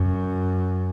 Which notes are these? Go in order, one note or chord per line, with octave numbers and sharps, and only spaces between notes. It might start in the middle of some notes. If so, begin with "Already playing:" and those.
Already playing: F#2